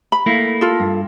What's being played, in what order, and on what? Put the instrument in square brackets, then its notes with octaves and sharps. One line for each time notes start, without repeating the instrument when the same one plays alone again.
[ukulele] B5
[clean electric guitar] A3 A#3 E4
[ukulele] F4 A4
[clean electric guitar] G2